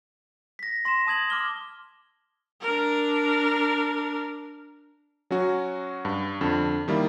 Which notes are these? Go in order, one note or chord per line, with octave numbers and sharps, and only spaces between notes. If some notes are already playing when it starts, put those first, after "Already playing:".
A#6 B6
C6 A#6 B6 E7
A5 D#6 G#6 F#7
D6 F6 G7
D4 A#4
F#3 C#4 F#4
G2
F2 D3 D4
D#3 G3 A#3 E4